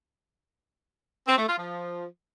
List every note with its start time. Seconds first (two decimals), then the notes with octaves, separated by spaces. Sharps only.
1.28 C4
1.38 A3
1.48 F4
1.58 F3